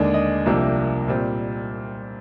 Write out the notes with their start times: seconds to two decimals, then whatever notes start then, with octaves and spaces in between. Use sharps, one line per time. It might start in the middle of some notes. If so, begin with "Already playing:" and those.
Already playing: D#2 D3 G#3 D4 G#4
0.14 D#5
0.46 C2 C3 F3 A#3 D4
1.08 A#2 G3 C4